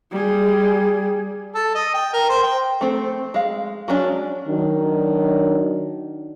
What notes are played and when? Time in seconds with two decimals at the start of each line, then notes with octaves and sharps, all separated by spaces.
0.12 G3 G#4
1.55 A4
1.75 D#5
1.94 G5
2.13 A#4
2.29 C5
2.43 G5
2.81 A3 C4 A4
3.34 G#3 F5
3.88 F#3 G#3 C#4 D4
4.48 D#3 F#3 D4